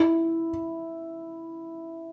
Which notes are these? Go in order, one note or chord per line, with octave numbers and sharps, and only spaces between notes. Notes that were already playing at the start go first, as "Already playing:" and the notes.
Already playing: E4